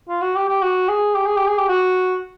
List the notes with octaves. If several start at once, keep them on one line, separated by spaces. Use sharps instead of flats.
F4
F#4
G4
G4
F#4
G#4
G4
G#4
G4
G#4
G4
F#4